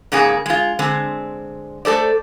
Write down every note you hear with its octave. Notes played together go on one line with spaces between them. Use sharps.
G#2 C#3 A#3 G#4
G#3 F4
D3 G#3 C4
A3 A4 C5 D5